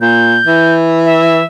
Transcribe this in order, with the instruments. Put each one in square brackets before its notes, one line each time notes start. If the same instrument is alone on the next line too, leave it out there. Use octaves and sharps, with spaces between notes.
[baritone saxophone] A#2 [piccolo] G6
[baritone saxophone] E3
[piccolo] E5